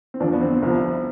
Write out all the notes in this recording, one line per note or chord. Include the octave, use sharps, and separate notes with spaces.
C4
E2 D3 F3 D4
B3
C4
C2 C3 F3 B3